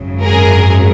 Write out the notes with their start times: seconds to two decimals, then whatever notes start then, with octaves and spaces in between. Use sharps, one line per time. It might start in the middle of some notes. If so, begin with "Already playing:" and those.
Already playing: G#1 F#2 C#3 F#3
0.23 G#4 A#4